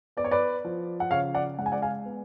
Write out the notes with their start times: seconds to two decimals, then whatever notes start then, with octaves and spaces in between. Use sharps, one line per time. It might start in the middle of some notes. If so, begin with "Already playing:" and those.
0.17 B3 D5
0.24 C#5
0.31 B4 D5
0.65 F3
1.00 F#5
1.11 C#3 C#5 F5
1.34 D5 F#5
1.58 G#3 F#5
1.66 G#5
1.72 D5 F#5
1.82 F5 G#5
2.05 B3